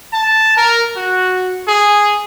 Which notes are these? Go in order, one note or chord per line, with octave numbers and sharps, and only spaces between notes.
A5
A#4
F#4
G#4